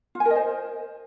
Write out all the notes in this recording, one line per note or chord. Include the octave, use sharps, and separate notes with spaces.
F4
G#5
A#4
D#5
C5